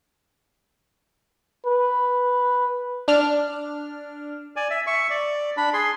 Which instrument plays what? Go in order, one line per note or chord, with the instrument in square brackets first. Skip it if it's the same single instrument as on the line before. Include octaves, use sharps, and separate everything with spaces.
[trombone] B4
[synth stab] D4 F6
[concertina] D5 G#5
E5
E5 C#6
D5
D4 B5
G#4 C6